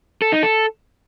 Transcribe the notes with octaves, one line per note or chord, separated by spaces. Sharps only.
A4
D#4
A4